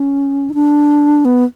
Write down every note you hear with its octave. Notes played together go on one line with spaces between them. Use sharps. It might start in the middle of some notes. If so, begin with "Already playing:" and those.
Already playing: C#4
D#4
D4
B3